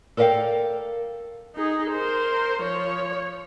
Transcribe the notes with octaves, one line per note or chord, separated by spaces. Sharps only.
A4 A#4 D5 E5 F5 G5
D#4 G#4
A#4 C5
F3 C#5